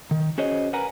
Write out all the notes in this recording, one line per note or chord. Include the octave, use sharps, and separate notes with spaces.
D#3
C#4 F#4 G#4 C5 C#5 D#5
A#4 B4 F#5 G#5 A#5